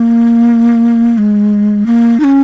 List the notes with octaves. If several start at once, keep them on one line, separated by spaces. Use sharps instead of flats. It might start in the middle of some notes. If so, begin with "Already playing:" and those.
Already playing: A#3
G#3
A#3
D#4
C#4